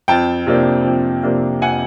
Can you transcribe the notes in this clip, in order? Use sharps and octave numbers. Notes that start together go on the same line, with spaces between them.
F2 G5 A5
C3 F3 A#3 D4
F2
C3 F3 A#3 D4
F2 F#5 G#5